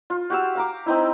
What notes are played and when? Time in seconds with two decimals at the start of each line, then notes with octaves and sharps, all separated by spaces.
0.10 F4
0.30 F#4 G4 F5 E6
0.55 F5 A#5 D6
0.86 C4 D#4 E4